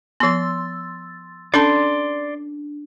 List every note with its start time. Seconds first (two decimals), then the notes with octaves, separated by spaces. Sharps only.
0.20 F3 B3 C6 E6 A6
1.54 C#4 D4 A4 D5 A5 C6